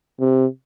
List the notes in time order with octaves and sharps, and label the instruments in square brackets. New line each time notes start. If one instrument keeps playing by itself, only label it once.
[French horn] C3